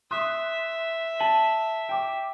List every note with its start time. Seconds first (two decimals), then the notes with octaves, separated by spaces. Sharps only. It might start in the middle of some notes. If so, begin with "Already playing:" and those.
0.11 E5 C6 D#6 F#6
1.20 A5 D#7 F#7
1.89 G5 D6